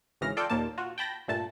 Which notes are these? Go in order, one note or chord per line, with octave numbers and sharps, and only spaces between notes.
G#1 C#3 E3 F6 A#6
F4 A4 D5 G5 G6
D#2 A#2 A#3 A5
F4 F#4
G5 A5 B5 A#6
G2 A#2 A3 A5